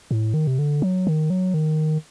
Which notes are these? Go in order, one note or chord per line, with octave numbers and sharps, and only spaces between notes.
A2
D#3
C3
D3
F#3
D#3
F#3
D#3